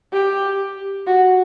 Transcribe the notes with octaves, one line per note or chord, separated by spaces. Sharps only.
G4
F#4